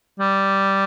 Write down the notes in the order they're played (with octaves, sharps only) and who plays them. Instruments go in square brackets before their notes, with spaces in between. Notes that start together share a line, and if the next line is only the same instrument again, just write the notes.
[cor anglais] G3